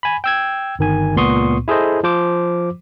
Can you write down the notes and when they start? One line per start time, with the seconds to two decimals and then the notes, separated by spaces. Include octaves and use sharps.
0.03 G#5 B5
0.24 G5 E6 G#6
0.79 G1 D#3 G#5
1.16 C#2 A#2 B3 C6 C#6 D#6
1.68 E4 G#4 A4 C5 D#5
2.04 F3 C5 D6